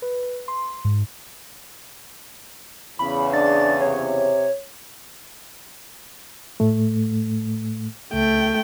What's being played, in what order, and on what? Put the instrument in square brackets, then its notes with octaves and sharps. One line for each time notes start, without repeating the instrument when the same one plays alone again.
[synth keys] B4
C6
G#2
[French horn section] E2 C#3 [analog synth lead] B5
[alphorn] D4 [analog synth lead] A6
[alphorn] C3 [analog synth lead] C#5
[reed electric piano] A2 A3
[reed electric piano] C#2 [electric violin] A3 G5